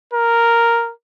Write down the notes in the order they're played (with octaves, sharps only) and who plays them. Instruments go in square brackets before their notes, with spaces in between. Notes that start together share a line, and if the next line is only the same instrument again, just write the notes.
[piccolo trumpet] A#4